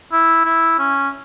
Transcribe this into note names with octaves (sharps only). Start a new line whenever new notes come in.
E4
E4
C#4